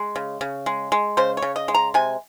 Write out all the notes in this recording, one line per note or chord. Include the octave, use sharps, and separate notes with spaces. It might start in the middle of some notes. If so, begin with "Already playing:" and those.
Already playing: G#3
C#3
C#3
G#3
G#3
C#3 C5
C#5
C#3
D#5
G#3
A#5
C3 G#5